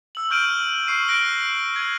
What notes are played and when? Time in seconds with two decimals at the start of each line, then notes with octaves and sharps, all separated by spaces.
0.15 E6 F#7
0.30 C#6 F6 G6 D7 D#7 F#7
0.87 C#6 C7 D#7
1.08 F#6 A#6 D7 F#7 G7
1.76 G#6 D#7